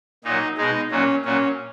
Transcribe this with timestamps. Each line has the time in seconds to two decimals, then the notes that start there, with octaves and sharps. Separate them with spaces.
0.24 A#2 F#3 D#4
0.58 B2 G#3 D#4
0.91 A#2 F#3 C#4
1.25 A#2 F#3 C#4